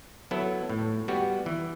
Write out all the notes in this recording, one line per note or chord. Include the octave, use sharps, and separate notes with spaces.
F#3 B3 E4 A4
A2
G3 B3 F#4
E3